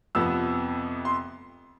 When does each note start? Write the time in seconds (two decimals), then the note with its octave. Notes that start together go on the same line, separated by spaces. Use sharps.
0.15 F2 C3 F3 B3 E6
1.05 C6